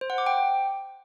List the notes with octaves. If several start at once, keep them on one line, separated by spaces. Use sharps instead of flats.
C5
F#5
D6
G5